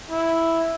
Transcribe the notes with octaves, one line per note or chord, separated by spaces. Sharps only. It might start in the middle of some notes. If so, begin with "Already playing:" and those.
E4